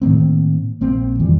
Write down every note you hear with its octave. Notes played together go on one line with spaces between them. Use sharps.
A2 D#3 A#3 C4
A#1 A#3 C4
F2 D#3 E3 G3